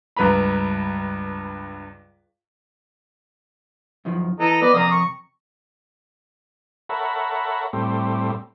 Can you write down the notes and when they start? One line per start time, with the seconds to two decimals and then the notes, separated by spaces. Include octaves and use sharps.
0.16 C#2 G2 B4 A#5 B5
4.05 F#2 D#3 F3
4.40 E3 A4 D#5 A#5
4.62 B3 B4 D5 D#5
4.74 F2 C3 A#3 A#5 D#6
4.91 C#6
6.89 A4 A#4 C#5 E5 F#5 B5
7.73 A2 G3 C4